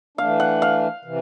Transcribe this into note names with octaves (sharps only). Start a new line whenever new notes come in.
E3 A3 D4 F5
F#5
F5
C3 E3